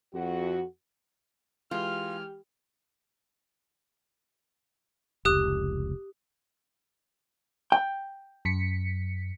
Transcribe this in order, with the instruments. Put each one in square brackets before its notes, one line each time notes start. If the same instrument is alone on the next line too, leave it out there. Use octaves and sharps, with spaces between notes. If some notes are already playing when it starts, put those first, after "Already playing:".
[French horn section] F2 F#4
[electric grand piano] E3 G#3 [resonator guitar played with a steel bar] F4 [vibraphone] G4 G5 [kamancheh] F6
[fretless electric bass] F1 C#2 [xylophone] G4 D#6 F#6
[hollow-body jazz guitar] G5
[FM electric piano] F#2 B6 C#7